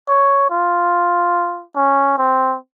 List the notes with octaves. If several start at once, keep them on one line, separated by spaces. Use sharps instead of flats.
C#5
F4
C#4
C4